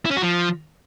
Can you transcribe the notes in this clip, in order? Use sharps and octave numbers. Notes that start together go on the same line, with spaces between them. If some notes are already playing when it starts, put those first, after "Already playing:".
E4
C#4
F#4
F3